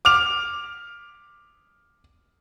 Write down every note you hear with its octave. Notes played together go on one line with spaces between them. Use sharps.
D6 F6 F7